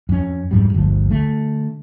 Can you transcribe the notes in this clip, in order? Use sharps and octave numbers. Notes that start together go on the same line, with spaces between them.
F2 C#4
F2 G#2 G3
G1 D2 F3
D3 A3